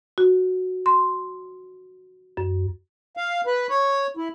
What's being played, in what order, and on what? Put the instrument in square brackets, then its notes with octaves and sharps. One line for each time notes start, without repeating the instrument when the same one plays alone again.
[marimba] F#4
C6
F#2
[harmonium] F5
B4
C#5
E4